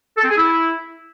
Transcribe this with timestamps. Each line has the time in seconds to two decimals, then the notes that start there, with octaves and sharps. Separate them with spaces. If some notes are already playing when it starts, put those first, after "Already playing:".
0.17 A4
0.23 C4
0.30 G#4
0.36 E4